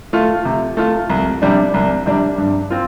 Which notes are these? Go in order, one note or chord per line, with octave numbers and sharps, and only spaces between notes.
A3 F4
C3
A3 F4
C2
C3 G3 D4
C2
C3 G3 D4
G2
C4 F4